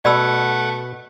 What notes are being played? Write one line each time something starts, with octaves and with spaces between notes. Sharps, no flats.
B2 A3 D5 F#5 B5 E6